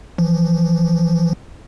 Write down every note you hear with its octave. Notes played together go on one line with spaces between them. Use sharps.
E3 F3